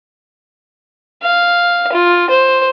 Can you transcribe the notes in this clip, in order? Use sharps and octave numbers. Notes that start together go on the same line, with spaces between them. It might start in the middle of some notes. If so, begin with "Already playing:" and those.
F5
F4
C5